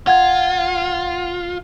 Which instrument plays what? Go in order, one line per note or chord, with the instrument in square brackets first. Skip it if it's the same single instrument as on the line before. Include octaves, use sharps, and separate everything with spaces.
[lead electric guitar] F4 [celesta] F#5 G#6